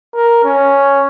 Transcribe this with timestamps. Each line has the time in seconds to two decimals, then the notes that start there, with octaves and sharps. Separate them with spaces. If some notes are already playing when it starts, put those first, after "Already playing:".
0.15 A#4
0.44 C#4